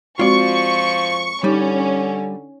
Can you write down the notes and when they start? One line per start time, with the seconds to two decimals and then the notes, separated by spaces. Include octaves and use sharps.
0.19 F3 G#3 C4 F4 F#4 D5 C#6
1.44 D3 G3 C#4 D#4